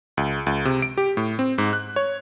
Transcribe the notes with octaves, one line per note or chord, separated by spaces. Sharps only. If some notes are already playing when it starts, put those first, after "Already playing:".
C#2
C#2
C3
D7
G4
A2
C4
G#2
F#6
C#5